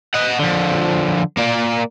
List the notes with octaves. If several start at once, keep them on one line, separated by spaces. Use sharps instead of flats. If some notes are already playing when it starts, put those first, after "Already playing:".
D#5 F#5
D3 F3
A#3 D5